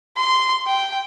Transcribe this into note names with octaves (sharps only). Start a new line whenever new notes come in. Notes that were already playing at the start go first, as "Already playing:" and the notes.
C6
G5